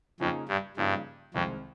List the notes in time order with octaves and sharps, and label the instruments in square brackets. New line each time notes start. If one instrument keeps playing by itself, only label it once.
[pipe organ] F2 [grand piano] C#3 F3 A#3 D#4 G#4
[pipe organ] G2
[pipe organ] G2 [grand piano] C#3 F3 A#3 D#4 G#4
[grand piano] C2 C3 D#3 G#3 C4 [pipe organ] F2